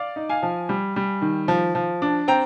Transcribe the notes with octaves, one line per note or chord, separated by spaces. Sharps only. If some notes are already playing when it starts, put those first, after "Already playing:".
Already playing: D5 F5
D#4
F5 G#5
F3
G3
G3
D#3
F3
F3
D4
C4 G5 A#5